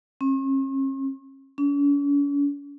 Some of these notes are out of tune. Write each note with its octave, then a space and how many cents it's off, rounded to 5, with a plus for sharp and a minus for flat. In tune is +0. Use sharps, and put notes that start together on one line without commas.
C#4 -45
C#4 +45